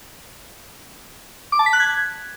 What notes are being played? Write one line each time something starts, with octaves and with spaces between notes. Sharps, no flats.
D6
A5
B6
F#6
G#6